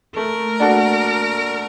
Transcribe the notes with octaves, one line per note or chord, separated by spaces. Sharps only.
A3 A#4
D4 F#4 A4